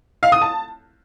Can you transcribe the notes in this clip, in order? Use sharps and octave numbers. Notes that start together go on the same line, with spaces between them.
F5
D#6
A5